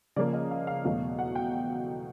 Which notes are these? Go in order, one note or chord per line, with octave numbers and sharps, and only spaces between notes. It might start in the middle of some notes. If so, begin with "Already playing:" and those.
C#3 F3 A#3 D5
D#5
F5
F5
E2 B2 F#3 A3 F5
F#5
G5